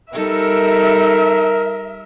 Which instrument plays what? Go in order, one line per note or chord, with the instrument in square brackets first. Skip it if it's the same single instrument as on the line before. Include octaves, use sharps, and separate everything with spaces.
[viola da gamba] G3 D#4 A4 [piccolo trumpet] A#4 [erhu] E5